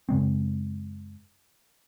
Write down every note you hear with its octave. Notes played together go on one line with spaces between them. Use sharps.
F#2 C#3 G#3 C4